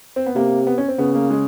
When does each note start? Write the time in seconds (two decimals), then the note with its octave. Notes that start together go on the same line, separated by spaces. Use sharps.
0.16 C4
0.26 B3
0.35 C3 A#3
0.67 B3
0.78 C#4
0.88 C4
0.98 C#3 B3
1.14 A#3
1.30 G#3